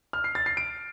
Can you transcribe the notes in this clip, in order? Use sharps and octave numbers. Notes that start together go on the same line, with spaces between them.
F6
C7
A6
C7
D7